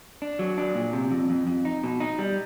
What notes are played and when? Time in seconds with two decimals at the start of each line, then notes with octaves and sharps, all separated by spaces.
0.22 D4
0.39 F#3
0.58 D4
0.75 A#2
0.93 C3
1.11 F2
1.30 F2
1.47 F2
1.65 D#4
1.84 B2
2.00 D#4
2.18 G3